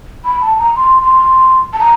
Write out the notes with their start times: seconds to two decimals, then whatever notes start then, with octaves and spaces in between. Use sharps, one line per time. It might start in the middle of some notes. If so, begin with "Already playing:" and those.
0.25 B5
0.42 A5
0.59 A#5
0.76 C6
1.02 C6
1.73 A5
1.80 A#5